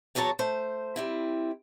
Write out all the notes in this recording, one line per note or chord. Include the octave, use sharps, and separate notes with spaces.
E2 F#3 C#5 E5 A5 A#5
A3 C5
G3 C4 E4